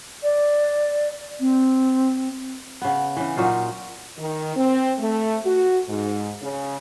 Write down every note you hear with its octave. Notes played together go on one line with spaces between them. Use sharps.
D5
C4
C#3 B3
C#3 E3
A#2 F#3 D#4 F4
D#3
C4
A3
F#4
G#2
C#3